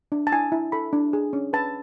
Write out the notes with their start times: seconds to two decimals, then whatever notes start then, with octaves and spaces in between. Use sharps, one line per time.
0.12 D4
0.27 A5
0.32 E4 G#5
0.52 E4
0.72 A4 B5
0.93 D4
1.13 G#4
1.33 C#4
1.53 B4 A5